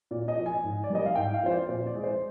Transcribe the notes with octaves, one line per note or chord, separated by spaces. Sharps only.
A#2 D5
D#5
F3 A#3
G#5
G#2
D5
G3 A#3 D#5
F5
G#2 G5
F5
F3 A#3 C5
D5
A#2 C5
D5
G#3
C5